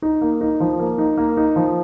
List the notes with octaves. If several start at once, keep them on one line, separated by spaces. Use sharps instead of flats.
D#4
A#3
D#4
F3
A#3
D#4
A#3
D#4
F3